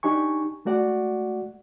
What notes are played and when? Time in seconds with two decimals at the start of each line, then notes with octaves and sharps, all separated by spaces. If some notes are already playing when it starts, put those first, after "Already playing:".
0.03 D4 D#4 G4 G#5 C#6
0.65 G#3 A3 F#4 D5 F#5